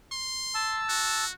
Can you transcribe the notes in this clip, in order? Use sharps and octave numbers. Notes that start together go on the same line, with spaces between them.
C6
A5 E6
F#4